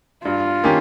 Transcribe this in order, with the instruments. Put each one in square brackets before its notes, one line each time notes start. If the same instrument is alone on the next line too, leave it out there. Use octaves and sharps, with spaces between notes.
[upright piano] G2 [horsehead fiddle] F4
[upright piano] D#3 A#3 C#4 G4